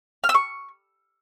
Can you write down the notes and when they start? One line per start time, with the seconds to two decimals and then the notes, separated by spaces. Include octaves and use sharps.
0.24 F6
0.29 E6
0.34 C#6